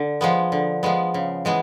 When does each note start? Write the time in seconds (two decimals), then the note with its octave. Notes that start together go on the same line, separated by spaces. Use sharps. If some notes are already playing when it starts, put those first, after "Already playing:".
Already playing: D3
0.21 F3 G#3 B3
0.52 D3
0.83 F3 G#3 B3
1.14 C#3
1.45 E3 G#3 B3